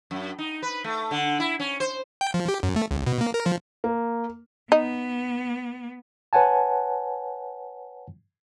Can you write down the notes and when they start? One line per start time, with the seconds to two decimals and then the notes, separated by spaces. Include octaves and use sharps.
0.11 F#2
0.38 D#4
0.62 B4
0.84 A3
1.11 D3
1.40 E4
1.60 C#4
1.80 C5
2.21 G5
2.34 F3
2.48 G4
2.63 F#2
2.76 A3
2.91 C#2
3.07 B2
3.21 A#3
3.34 A#4
3.46 F3
3.84 A#3
4.72 B3 D#4
6.33 B4 C#5 F#5 G#5 A5